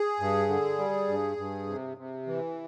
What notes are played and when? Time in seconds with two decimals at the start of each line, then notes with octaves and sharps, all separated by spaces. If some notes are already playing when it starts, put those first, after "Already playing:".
Already playing: G#4
0.20 G2
0.48 D3
0.78 G3
1.08 G2
1.37 G2
1.67 C3
1.97 C3
2.27 E3